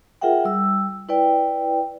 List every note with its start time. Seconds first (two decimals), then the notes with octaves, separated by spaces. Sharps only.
0.21 F4 G#4 A#4 E5 F#5 G5
0.45 G3 E6
1.09 E4 B4 D5 G5